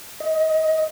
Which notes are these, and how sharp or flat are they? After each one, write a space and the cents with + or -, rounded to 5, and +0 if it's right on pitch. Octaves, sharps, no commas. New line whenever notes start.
D#5 +25